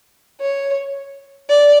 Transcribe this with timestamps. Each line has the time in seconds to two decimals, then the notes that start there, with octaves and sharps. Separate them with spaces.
0.40 C#5
1.50 D5